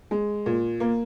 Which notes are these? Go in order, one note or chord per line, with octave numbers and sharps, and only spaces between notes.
G#3
A#2
A#3